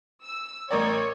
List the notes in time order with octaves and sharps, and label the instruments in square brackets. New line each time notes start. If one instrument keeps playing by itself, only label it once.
[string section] E6
[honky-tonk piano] A1 A#4 D5 [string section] C#5